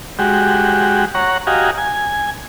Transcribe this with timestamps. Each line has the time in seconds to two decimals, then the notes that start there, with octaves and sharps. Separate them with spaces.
0.19 G#3 F#4 G4
1.15 C#5 F#5 A#5
1.47 F#4 G4 D#5 F5 G#5 A#5
1.78 G#5